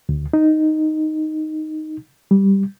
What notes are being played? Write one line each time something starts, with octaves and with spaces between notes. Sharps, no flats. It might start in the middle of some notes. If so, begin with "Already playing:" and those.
D2
D#4
G3